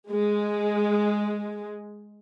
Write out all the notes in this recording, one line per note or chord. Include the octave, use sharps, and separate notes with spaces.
G#3